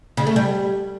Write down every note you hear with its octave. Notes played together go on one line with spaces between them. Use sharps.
C#3
A3
G3